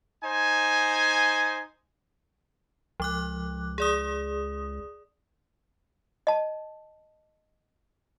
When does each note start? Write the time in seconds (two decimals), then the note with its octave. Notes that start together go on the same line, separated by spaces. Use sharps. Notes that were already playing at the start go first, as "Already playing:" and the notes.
0.23 D#4 C5 G#5
3.00 C#2 F3 D6 F#6
3.78 G#4 D5 D#6
6.27 D#5 A5